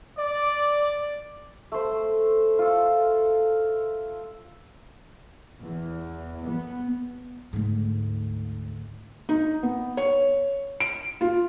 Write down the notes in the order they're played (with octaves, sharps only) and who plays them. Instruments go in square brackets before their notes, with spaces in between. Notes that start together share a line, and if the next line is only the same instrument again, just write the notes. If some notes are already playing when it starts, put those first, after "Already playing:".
[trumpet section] D5
[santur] A3 C5
F4 A4
[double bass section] E2
B3
[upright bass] D2 G#2
[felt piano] D#4
B3
C#5
D7
F4